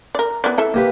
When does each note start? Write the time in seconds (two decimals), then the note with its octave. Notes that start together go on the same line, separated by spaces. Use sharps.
0.15 A#4 D5
0.44 B3 E4 D5
0.58 E4 A4 E5
0.74 A#3 G4 B4